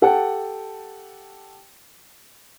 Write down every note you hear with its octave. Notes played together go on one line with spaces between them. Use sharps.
G4 A4 F#5 G5 A5